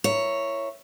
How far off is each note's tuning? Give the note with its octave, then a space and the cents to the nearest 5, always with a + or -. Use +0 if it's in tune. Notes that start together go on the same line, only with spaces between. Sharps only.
E4 +15 A#4 +0 C#5 +0